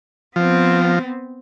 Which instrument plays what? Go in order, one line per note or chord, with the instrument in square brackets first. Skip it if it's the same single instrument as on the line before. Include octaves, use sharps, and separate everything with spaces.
[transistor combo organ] F3 [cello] B3 C4